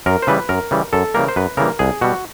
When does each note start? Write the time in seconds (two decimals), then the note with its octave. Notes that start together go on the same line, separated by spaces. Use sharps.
0.06 F#2 A#4
0.22 C5
0.27 C#3 E3 G3 B4
0.49 F#2 A#4
0.71 C#3 E3 G3
0.93 F#2 A4
1.14 C#3 E3 G3 A#3 A#4
1.28 C5
1.36 F#2 B4
1.57 C#3 E3 G3 A#3 A#4
1.79 C2 G#4
2.01 B2 G3 F#4